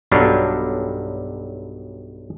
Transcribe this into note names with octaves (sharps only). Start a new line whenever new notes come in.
B1 G2 F#3 G3 D4 F4